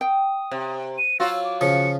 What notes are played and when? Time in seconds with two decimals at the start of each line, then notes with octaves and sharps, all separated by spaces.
0.01 G5 D#6
0.51 C3
0.98 D#7
1.20 F#3 F4 F#4 E6
1.44 D6
1.61 C#3 F3 C#7